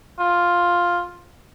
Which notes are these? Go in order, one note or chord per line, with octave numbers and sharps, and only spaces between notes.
F4